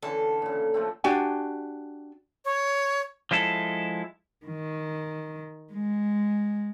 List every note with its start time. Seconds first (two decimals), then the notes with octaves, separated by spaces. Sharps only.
0.02 D3 E3 C#4 A4
0.42 A#2 C#3
0.74 F3 A3 C4
1.04 D4 F#4 G4 G#5
2.45 C#5
3.31 F3 G#3 E4 A4
4.46 D#3
5.73 G#3